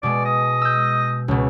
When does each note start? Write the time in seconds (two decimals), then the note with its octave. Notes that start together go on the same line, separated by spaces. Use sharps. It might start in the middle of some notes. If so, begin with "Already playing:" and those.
0.03 B2 G#3 D5
0.25 D#5
0.61 E6 G6
1.28 C#2 B2